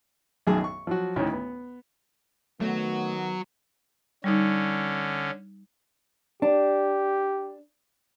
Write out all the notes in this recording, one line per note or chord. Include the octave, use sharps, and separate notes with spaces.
B1 F#2 D#3 G#4 A5
C#6
F3 F#3 F#4
D2 A2 D#3 C#4
B3
D#3 F#3 A3 B3
D3 G3 C#4 D#4
D4 G4